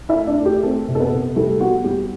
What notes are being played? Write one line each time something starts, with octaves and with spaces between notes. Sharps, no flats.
E4 E5
A3
D4 D5
A3
G4
A3 C4 A4
C3
A4
B3 B4
C3
G3 A3 A4
B3 F#4
G3 G4